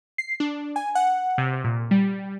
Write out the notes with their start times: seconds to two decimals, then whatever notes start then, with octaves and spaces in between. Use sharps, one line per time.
0.18 C7
0.40 D4
0.76 G#5
0.95 F#5
1.38 C3
1.64 A#2
1.91 G3